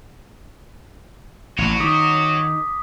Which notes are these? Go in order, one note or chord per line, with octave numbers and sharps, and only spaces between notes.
A1 F#4 C#5
D#3 D6 D#6 B6